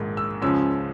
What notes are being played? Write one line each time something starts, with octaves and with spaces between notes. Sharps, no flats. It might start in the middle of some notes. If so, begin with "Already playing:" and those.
Already playing: A#1 G#2 D#3 G#3
E6
C#2 C#3 F3 G#3 C#4 E6